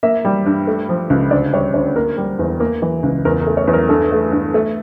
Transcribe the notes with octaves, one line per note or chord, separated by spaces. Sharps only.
A#3 E5
G3
G2
A3
F3
C#2
D2 D5
G3 C#5
D2 C#5
A#3 A#4
G3
E2
A#3
E3
C#2
E2 A#4
A#4
A3
C#5
E2
A#4
G2 A4
A3
G2
A3